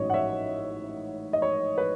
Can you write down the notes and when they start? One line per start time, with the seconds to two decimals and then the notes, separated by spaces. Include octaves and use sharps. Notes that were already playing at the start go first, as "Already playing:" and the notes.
Already playing: A1 G#2 F#3 C#4 C#5 D#5
0.10 F#5
0.14 C#5 E5
1.33 D#5
1.42 C#5
1.78 B4